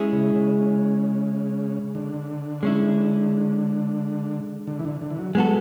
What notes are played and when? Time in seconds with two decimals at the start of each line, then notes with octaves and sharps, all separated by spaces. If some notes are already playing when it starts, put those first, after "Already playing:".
Already playing: G#3 C#4 E4 G#4
0.13 C#3
0.36 C#3
1.95 D3
2.63 G#3 C#4 E4
4.67 D3
4.79 E3
4.85 D3
5.02 D3
5.11 E3
5.18 F#3
5.35 F#3 G#3 B3 F#4 A4